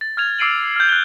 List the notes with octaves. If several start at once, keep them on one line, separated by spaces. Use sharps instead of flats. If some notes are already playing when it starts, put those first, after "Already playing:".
A6
F6 G#6 F7
D6 E6 C7 D7 D#7 F#7
F6 G6
F#6 A6 C7 G7